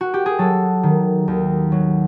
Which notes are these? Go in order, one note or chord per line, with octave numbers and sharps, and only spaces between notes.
F#4
G4
G#4
F#3 A4
D#3
D#2
F#3